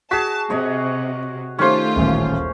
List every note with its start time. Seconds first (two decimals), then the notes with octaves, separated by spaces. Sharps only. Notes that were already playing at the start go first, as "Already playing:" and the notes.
0.11 F#4 G#4 A5 B6
0.50 C3 G#4 C#5 D#5
1.59 D#3 A3 C#4 F4 G4 C5
1.96 D#1 A1 D#2